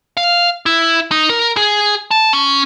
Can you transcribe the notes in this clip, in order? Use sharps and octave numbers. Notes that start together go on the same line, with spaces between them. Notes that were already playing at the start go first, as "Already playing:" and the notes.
F5
E4
D#4
A#4
G#4
A5
C#4